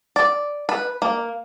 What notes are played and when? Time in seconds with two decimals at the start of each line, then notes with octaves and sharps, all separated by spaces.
0.16 D5
0.69 B4
1.02 A#3